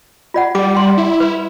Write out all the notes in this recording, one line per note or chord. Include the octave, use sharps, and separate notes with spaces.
F4 D5 F#5
G3 D6
C6
E4
B4